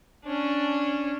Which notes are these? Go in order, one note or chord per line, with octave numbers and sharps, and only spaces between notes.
C#4 D4